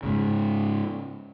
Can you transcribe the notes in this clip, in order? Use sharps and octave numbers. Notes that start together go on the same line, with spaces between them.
G#2 C#3